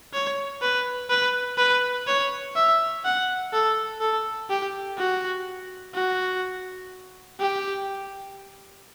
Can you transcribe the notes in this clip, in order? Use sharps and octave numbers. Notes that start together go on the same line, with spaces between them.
C#5
B4
B4
B4
C#5
E5
F#5
A4
A4
G4
F#4
F#4
G4